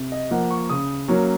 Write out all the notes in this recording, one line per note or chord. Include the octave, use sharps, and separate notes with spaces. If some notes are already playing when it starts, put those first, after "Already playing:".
Already playing: C3
D#5
F3 A#3 F#5
C#6
C#3 D#6
F#3 A#3 C#4